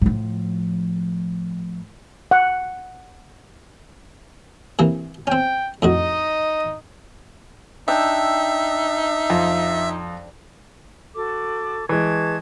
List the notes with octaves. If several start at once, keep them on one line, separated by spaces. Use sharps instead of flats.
A2 F3
F#5
C3 E3 A#3
C4 C#4 G5
F2 A2 D#4 F#4 D#5
D4 D#4 E5 G5 E6
F2
F#4 A4 D6
E3 G#3 A5 C#6 G#6